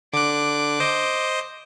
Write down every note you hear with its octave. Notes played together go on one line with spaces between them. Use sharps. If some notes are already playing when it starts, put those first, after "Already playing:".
D3 D6 F#6
C5 D#5